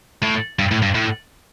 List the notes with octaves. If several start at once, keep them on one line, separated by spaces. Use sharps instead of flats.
A2
G2
A2
G2
A2